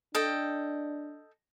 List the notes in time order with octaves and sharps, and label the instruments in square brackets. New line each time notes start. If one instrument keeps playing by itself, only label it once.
[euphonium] D4 [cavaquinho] A4 D#5 G5